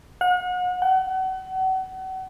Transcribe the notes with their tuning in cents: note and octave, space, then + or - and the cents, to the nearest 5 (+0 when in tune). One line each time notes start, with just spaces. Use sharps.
F#5 -40
F#5 +35